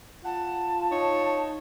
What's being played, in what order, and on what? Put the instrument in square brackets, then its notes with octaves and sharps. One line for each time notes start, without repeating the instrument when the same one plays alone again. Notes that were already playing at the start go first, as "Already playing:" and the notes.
[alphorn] F4 [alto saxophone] F#5 [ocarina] A5
[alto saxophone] D#4 [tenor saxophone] C#5